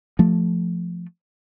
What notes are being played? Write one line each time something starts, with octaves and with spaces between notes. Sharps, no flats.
F3 A3